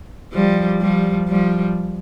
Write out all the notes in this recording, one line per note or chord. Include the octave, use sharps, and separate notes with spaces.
F3 G3
F3 G3
F3 G3